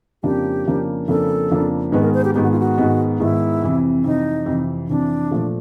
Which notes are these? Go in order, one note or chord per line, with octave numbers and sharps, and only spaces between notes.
F2 C#3 F3 A#3 D4 G4
F2 C#3 F3 A#3 D4
F2 C#3 F3 A#3 D4 A4
F2 C#3 F3 A#3 D4
G#2 D#3 G#3 B3 B4
A#4
C5
G4
G#2 D#3 G#3 B3 G4
F#4
F4
F#4
G#2 D#3 G#3 B3
G#2 D#3 G#3 B3 E4
F2 C3 E3
F2 C3 E3 D#4
F2 C3 E3
F2 C3 E3 D4
A#2 F3 A3